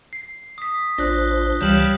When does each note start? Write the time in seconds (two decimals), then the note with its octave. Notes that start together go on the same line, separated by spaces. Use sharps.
0.13 C7
0.58 D#6 B6
0.98 A1 D4 F4 C5 F#6 A#6
1.61 C#2 E3 G3 C#5 F5 A5 G6 F#7